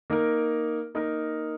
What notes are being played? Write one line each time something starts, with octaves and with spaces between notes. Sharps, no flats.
A#3 D#4 A#4
A#3 D#4 A#4